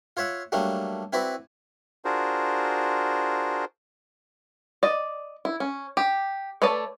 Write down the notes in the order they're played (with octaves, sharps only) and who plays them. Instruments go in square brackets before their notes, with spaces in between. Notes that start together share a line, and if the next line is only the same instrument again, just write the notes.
[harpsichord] F4 C#5 E5 F#5
F#3 G3 A3 A#3 D4
C4 E4 F#4 B4 D5
[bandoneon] D4 F4 F#4 G#4 A#4 C5
[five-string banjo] D5 D#5
E4
C#4
G4
A3 B4 C#5 D5 A5